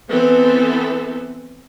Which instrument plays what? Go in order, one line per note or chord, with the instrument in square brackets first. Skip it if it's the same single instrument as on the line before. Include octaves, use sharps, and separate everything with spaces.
[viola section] E3 B3 C4 A4